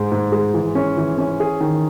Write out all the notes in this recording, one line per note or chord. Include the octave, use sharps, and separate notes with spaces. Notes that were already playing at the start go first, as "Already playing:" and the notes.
Already playing: G#2 G#3
G#2
G#3
E3
C#4
E3
C#4
G#4
D#3